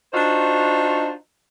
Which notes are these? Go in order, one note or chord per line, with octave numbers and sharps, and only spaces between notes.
D4 D#4 F4 F#4 C5